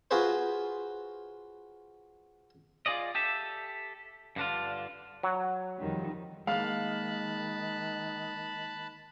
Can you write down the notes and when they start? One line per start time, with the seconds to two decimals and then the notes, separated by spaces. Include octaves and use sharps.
0.11 F4 F#4 G#4 B4 C5
2.86 F4 G#4 D5 D#5
3.15 G4 A4 E5
4.36 G2 D3 D4 F4
5.23 F#3
5.78 F2 D#3 G3
6.47 D#3 G#3 A#3 F5 A5 B5 F#6